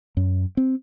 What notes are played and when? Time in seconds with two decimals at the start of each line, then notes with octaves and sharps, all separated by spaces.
0.17 F#2
0.57 C4